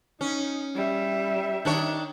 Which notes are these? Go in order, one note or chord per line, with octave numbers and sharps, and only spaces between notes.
C#4 D#4
G3 E5
D#3 D4 C#5